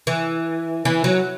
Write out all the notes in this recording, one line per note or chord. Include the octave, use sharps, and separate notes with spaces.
E3
E3
F#3